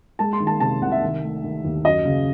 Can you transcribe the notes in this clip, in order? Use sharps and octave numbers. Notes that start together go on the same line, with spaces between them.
G#3 A5
C6
D#3
A5
C3 A5
C2 F#5
E5
D#3
A3
D#3
D#2
F#2 D#5
C#3